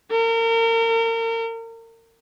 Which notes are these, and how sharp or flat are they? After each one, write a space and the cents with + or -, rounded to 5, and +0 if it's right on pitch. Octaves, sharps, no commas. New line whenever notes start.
A#4 -35